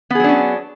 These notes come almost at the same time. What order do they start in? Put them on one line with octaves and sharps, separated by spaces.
B3 G#4 F#3 D4 C#4